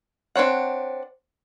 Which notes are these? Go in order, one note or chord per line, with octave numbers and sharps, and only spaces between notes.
C4 D4 C#5 F#5